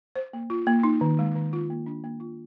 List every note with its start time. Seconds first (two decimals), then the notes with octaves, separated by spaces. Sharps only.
0.16 C5
0.33 A#3
0.50 F4
0.67 A#3
0.83 D#4
1.01 D#3
1.19 G#3
1.36 D#3
1.53 F4
1.70 A#3
1.86 D4
2.04 A#3
2.20 F4